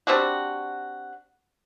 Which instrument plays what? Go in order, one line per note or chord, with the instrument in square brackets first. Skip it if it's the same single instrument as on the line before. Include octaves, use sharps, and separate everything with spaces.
[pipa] G3 C4 D4 F#4